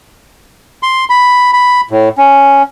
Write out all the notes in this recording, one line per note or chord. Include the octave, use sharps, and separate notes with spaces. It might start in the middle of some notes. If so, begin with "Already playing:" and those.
C6
B5
B5
A2
C#4